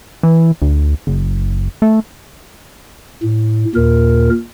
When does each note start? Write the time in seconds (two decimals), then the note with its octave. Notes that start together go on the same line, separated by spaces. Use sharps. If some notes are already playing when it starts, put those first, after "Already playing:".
0.23 E3
0.62 D2
1.07 F#1
1.82 A3
3.23 A2
3.75 D#2 A#2 A#4